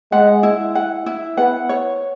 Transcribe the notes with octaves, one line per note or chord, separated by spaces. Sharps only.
G#3 F#5
E4
F#5
E4
B3 F#5
C#5